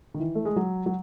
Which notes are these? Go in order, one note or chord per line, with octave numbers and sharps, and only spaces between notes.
D#3
E3
A3
G#3
F#3
F#3